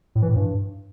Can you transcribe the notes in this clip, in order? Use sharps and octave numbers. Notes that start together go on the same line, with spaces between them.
A2
E3
A2
G2